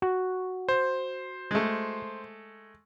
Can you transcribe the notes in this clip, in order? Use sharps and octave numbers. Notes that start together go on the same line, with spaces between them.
F#4
C5
G#3 A3